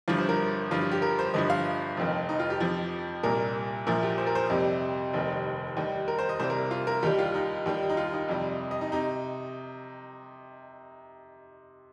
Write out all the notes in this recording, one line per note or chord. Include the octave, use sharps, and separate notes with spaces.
G1 G2 F3 F4
C5
A#4
G1 G2 F3 F4
F4
G4
A#4
C5
G1 G2 F3 D#5
F5
F1 F2 D#3
D#4
F4
G4
F2 F3
C2 A#2 G3 A#4
A#1 A#2 F3 A#4
G4
C5
A#4
C5
F2 C3 D#3 G3
F1 D#2 D#3 G3
D#2 D#3 G3
A#4
C5
D#5
C2 C3 G3 C5
A#4
F4
A#4
D#2 D#3 G3 G4
F4
D#4
D#2 D#3 G3
D#4
F4
D#4
F2 C3 G3
D#5
D#4
C3 D#4